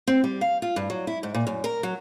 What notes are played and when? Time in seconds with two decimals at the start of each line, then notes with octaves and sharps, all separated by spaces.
0.07 C4
0.24 G3
0.41 F5
0.62 F4
0.76 G2
0.90 F#3
1.07 E4
1.23 G#2
1.35 A#2
1.47 F#2
1.64 A#4
1.83 F#3